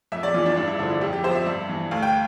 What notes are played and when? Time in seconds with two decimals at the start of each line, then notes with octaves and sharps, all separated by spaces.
0.12 F2 E5
0.23 D5
0.34 E3 F4
0.46 D4
0.56 G2 D4
0.68 E4
0.79 D3 F3 D4
0.90 E4
1.01 F2 G4
1.13 G4
1.24 C3 F3 C5
1.35 E5
1.46 G2
1.69 E3
1.91 D2 F5
2.03 G5